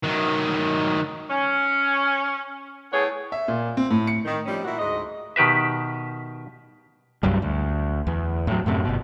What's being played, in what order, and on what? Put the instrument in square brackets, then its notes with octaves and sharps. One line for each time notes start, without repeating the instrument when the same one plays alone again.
[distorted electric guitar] D#3 F#3
[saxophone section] C#4
A2 B3 G#4 C#5
[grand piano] E5
A#2
C4
A2
C#7
[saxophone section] D#3
F3 G3 C4 C#4 D#4
A#2 E4 F#4
D2 G#2 G#3 D#5
[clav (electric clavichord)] B2 D#3 G4 B4 E5
[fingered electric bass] C2 G2 F#3 G3
D2
E2
A2 F#3
F#2 A2 C3
G1 B2